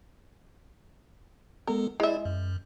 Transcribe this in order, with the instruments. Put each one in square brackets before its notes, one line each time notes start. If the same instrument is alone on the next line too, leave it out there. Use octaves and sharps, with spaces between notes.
[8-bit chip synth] G#3 B3 A4 [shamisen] A#4
[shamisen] G#3 E5 [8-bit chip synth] E4 D5
[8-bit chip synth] F#2